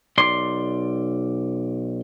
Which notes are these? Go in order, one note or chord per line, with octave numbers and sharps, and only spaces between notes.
B1 D5 C6